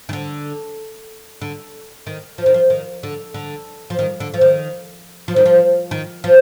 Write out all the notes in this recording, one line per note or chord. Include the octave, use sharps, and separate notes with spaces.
D#3
D3
D3
D#3
F3
D#3
F3
D#3
D3
D3
F3
D#3
D3
F3
D#3
F3
D#3
F3
D#3
F3